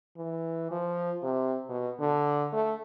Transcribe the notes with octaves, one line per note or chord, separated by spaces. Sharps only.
E3
F3
C3
B2
D3
A3